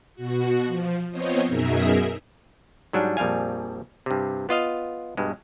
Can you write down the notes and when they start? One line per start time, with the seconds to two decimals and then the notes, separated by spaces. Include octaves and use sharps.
0.15 B2 F#4
0.66 F3
1.11 F3 B3 C4 C5 C#5 D#5
1.48 F#2 B2 D#4 G#4 A#4 E5
2.93 G#2 F#3 G3 D4
3.17 A#1 F2 G3 F5 G#5
4.06 G2 C3
4.49 B3 F4 D#5 F5
5.17 G2 B2 G#3